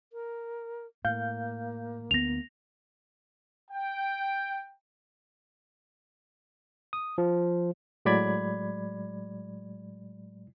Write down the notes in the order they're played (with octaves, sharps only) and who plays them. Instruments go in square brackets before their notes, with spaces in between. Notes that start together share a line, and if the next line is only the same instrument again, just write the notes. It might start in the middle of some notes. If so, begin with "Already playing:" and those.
[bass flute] A#4
[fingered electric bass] A2 [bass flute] A#3 [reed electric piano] F5 G6
[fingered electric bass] D2 B3 [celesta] A#6 F7
[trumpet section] G5
[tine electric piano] D#6
F3
[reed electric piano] A2 F#3 G#3 D5 B5 G#6